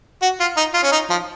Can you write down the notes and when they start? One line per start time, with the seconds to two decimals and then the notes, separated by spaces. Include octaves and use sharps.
0.23 F#4
0.40 F4
0.57 D#4
0.74 F4
0.83 C#4
0.92 D#4
1.10 F3